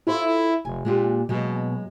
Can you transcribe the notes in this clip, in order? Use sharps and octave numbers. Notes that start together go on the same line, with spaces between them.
E4 F4 A4 C5
F1 G#5
A#2 G#3 D4 G4
F#2 B2 G#3 A#3